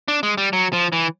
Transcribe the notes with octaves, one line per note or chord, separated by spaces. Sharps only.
D4
G#3
G3
F#3
F3
E3